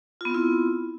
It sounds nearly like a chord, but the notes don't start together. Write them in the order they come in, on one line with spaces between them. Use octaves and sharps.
F4 B3 C4 E4